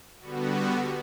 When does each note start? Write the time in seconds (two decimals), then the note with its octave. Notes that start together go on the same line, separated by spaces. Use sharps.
0.19 D3 G3 B3 F#4